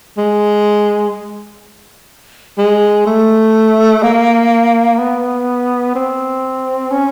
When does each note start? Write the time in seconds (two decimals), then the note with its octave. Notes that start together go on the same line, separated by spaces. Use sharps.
0.18 G#3
2.58 G#3
3.07 A3
4.03 A#3
4.99 B3
5.95 C4
6.91 C#4